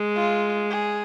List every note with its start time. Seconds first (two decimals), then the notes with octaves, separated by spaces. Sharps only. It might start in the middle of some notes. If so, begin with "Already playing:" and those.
Already playing: G#3
0.16 F4
0.71 G#4